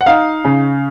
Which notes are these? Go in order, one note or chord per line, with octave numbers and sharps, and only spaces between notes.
F#5
D#4 F5
C#3